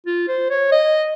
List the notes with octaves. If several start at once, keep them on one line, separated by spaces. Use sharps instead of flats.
F4
C5
C#5
D#5